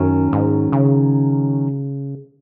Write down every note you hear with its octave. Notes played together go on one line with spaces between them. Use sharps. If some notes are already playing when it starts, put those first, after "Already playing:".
Already playing: F#2 D#3 F#3 C#4
G#2
C#3